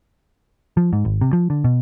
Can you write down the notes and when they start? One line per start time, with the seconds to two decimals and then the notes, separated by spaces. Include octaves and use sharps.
0.77 F3
0.93 G#2
1.05 G#1
1.21 C3
1.33 F3
1.50 D3
1.64 B2